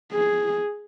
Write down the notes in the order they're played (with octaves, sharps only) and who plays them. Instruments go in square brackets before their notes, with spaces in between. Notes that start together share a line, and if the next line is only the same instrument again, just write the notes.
[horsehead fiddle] G#4